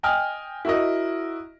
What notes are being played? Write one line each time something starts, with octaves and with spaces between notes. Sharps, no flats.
D#5 G5 G#5 D#6 F6
E4 F#4 A#4 D#5